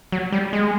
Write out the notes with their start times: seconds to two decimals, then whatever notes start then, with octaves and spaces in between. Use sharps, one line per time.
0.12 F#3
0.32 G3
0.53 G#3